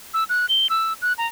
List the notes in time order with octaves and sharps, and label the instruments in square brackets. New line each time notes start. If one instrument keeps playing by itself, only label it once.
[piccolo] E6
F#6
G7
E6
F#6
A#5